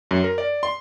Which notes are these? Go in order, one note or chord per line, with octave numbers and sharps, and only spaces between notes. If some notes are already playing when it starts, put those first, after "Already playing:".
F#2
A#4
D5
C6